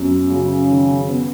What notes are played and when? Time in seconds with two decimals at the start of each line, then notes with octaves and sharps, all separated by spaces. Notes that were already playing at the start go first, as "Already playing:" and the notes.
Already playing: F#2 B3
0.30 C#3 F#3
0.70 D#3
1.09 B3